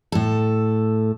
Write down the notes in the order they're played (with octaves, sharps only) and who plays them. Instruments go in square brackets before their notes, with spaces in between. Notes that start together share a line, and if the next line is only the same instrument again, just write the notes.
[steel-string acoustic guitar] A2 A4